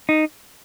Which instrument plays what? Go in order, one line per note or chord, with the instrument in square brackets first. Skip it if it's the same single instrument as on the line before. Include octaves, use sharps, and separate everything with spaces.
[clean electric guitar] D#4